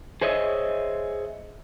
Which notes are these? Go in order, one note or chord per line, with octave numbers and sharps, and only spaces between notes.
G#4 C5 C#5 D#5 E5